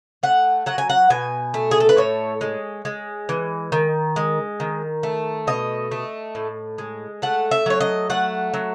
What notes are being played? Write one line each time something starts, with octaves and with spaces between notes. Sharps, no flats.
A3 F#5
F#3 F#5
G#5
F#5
B2 G#5
A3
G#4
A4
B4
A2 C#5
G#3
G#3
E3
D#3
G#3
D#3
A3
B2 D#5
A3
A2
G#3
A3 F#5
E5
F#3 C#5
D#5
A3 F#5
F#3